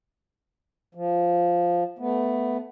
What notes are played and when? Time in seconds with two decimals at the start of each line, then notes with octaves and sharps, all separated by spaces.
0.95 F3
1.99 A3 B3